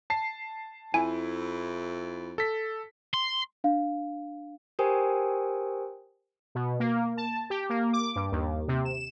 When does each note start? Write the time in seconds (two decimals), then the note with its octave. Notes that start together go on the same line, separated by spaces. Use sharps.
0.10 A5 C7
0.94 F2 E4 G#5
2.38 A4 B6
3.14 C6
3.64 D4 F5
4.79 G4 A#4 C5 G5 G#5 D#6
6.55 B2
6.80 A#3
7.17 A5
7.50 G4
7.70 A#3
7.93 D6
8.16 G2
8.32 D#2
8.68 C3
8.85 E7